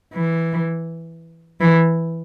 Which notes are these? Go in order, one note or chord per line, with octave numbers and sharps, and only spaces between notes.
E3
E3